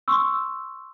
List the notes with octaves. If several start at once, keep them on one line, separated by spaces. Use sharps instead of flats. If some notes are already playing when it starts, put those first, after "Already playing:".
C6 C#6 E6